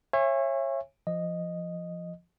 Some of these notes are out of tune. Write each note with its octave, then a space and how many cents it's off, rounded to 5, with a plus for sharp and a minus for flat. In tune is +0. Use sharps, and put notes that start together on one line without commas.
C#5 -25 E5 +25 G#5 -25
F3 -15 D#5 -5